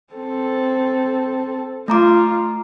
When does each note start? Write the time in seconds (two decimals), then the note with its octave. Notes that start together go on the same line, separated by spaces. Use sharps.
0.13 C4 A4
1.88 A3 F4 A#5 D6